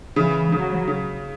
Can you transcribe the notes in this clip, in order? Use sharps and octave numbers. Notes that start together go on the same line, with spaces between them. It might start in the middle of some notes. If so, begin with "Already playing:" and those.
C#3 E3
C#3 F#3
C#3